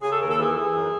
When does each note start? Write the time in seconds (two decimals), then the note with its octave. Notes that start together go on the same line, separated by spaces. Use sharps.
0.02 C#3 G#4
0.11 A4
0.20 D#2 A#4
0.29 A4
0.38 E3 G#4
0.56 E3
0.75 F#2